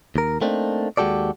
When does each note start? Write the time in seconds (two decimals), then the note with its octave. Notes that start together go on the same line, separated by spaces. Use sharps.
0.16 D#2 A#4
0.41 A3 A#3 C4 D4 D#4
0.97 D#2 G#3 F#4 G4 A4 D5